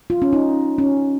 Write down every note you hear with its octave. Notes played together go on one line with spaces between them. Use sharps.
F4
C#4
D#4
C#4